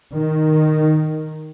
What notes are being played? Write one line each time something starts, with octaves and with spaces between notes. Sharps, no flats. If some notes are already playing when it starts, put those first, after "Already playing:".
D#3